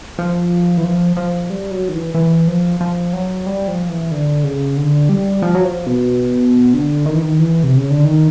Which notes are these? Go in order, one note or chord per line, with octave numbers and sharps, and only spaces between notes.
F3
E3
F3
F3
G3
F#3
D#3
E3
E3
F3
F3
F#3
G3
F3
E3
D3
C#3
D3
G3
F3
F#3
F3
B2
D3
D#3
E3
D#3
E3
C3
C#3
D3
D#3